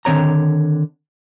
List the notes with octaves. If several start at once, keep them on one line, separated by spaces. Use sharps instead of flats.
D3 D#3 C4 C#5 A#5